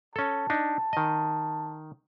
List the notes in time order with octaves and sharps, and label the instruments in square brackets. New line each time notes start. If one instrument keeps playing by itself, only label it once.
[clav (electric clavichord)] C#4 A4 [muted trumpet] A5
[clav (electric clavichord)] D4 D#4
D#3 D#5